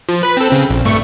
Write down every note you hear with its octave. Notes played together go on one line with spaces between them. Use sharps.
F3
B4 B5
C4 A4
C#3 C4
A#1
G2 A3 C#6